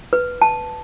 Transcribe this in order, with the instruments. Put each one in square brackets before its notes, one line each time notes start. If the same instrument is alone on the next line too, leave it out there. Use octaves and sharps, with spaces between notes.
[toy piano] B4
A5